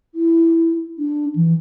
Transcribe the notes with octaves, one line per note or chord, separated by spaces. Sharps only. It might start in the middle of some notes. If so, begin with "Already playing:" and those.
E4
D4
E3